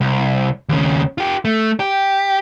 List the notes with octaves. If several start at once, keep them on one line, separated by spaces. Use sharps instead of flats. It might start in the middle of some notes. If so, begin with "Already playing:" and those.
C2
D#2 C#3
F4 G4
A3
G4